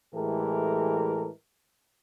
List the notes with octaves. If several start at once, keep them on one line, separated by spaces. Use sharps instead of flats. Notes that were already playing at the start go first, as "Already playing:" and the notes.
A2 E3 G#3 G4 A4 A#4